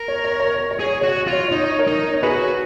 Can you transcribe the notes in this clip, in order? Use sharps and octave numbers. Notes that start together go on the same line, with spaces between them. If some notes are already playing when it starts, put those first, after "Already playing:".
Already playing: A#4
C#5
C#5
C#5
C#5
C#5
G#4
C#5
F#4 C#5
C#5
F4
C#5
C#5
D#4
C#5
A#4 C#5
D#4
C#5
F#4 G#4 B4